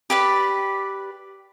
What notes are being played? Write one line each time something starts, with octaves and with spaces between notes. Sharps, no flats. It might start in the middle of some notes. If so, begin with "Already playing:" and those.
G4 B4 D5